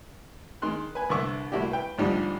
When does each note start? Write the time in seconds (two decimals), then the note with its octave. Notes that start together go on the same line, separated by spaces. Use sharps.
0.62 D#3 G#3 C6 F#6
0.95 B4 G#5
1.10 C2 D3 B4 E5 C#6 D6
1.52 C2 A3 E4 F#4 G4
1.71 B4 G5
1.98 A1 G#2 D3 F3 G3 D#4